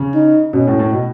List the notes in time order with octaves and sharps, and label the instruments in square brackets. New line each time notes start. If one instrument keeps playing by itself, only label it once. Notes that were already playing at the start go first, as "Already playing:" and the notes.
Already playing: [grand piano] C#3
[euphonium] D#4
[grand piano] B2 [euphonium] C#4
[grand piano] A2
A2
B2